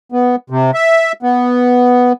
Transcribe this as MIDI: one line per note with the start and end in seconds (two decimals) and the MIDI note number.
0.12 0.36 59
0.50 0.71 48
0.74 1.12 76
1.23 2.13 59